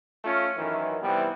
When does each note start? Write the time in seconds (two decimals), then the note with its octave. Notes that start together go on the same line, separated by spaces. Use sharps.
0.24 A3 C#4 F4
0.57 F#2 D#3 E3
1.02 C3 E3 G3 B3